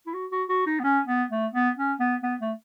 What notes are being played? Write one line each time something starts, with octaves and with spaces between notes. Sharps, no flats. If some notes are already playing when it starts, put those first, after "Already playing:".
E4
F#4
F#4
F#4
D#4
B3
C#4
B3
A3
B3
C#4
B3
B3
A3